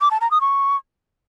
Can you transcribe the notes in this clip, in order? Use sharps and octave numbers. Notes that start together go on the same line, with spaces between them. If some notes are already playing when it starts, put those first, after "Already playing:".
D6
A5
A#5
D#6
C#6